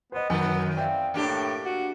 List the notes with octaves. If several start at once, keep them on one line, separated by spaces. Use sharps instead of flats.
B3 C5 D#5
F#2 D#3 F#3 B3
C4 D5 E5 F5
A2 A#3 D4 G4
F#4